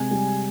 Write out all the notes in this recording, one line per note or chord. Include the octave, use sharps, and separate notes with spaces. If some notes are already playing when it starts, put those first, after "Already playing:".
Already playing: C3 G#3 G#5
G3